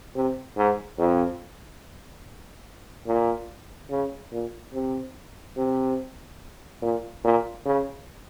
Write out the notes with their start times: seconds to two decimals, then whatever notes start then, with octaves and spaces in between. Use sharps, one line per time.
0.15 C3
0.57 G#2
0.98 F2
3.07 A#2
3.91 C#3
4.32 A#2
4.74 C3
5.57 C3
6.82 A#2
7.24 A#2
7.66 C#3